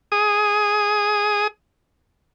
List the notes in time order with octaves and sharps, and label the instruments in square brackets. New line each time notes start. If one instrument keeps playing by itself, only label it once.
[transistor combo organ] G#4 D#6